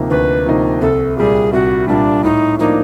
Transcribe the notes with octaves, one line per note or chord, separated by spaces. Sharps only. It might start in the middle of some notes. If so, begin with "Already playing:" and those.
Already playing: D2 C3 F3 A#3 D#4
D2 B4
C3 F3 A#3 D#4
C2 A4
A#2 G3 G#4
C2 F#4
A#2 G3 D4
A2 D#4
F3 A#3 D4 D#4